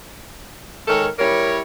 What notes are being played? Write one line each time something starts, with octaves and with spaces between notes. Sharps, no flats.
D#3 G#3 A4 A#4 C#5
G3 E4 A#4 C#5